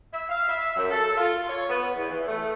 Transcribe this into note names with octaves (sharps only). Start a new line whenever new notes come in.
E5
F5
E5
F#2
A4
F4
C#5
B3
E2
E3
A3